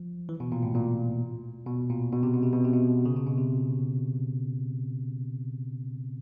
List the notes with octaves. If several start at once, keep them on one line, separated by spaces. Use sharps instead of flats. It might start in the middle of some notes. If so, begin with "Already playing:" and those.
Already playing: F3
E3
B2
A#2
A2
A#2
B2
A#2
B2
C3
B2
C3
B2
C3
B2
C#3
C3
B2
C3